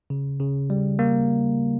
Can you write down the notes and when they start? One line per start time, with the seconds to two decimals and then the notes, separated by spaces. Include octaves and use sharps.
0.10 C#3
0.40 C#3
0.70 G3
0.99 A#3